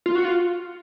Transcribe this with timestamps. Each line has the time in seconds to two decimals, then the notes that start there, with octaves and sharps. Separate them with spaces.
0.06 F4
0.15 F#4
0.25 F4